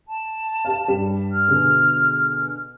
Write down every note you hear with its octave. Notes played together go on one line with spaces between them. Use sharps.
A5
G4 F5
G2 G3
F6
B2 D3 G#4